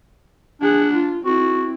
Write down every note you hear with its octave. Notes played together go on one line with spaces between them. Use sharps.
D4 G#4 F#5
F4
C4 E4 F#4